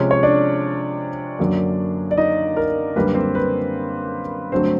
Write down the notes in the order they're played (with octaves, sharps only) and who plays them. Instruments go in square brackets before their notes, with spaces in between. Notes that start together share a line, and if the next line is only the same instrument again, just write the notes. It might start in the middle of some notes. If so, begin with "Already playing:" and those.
Already playing: [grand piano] C3 F3 G#3 C#4 C#5
C#5
D4 D5
F#2 D3 F#3 A#3
D5
D#4 D#5
A#4
F#2 D3 G3 A#3 B4
C4 C5
B4
G2 D3 F#3 A3 C4 C5